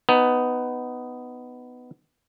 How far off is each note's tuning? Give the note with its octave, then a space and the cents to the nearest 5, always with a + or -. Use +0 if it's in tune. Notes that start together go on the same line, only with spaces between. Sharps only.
B3 +10 D#4 +0